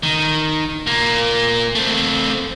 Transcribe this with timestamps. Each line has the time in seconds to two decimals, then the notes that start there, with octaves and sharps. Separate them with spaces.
0.03 D#3
0.86 A#2 A#3
1.75 A3 C4